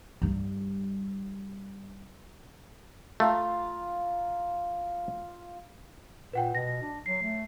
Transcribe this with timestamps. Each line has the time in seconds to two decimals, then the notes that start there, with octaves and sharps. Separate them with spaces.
0.22 G2 G3
3.20 A3 F4 F5 A#5
6.33 A#2 B4 F#5 G5
6.55 B2 A#6
6.82 D4
7.06 F#3 C7
7.22 A3